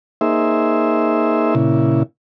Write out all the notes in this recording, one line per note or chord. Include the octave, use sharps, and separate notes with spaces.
A#3 D#4 G#4 C5 E5
A#2 C#3 E4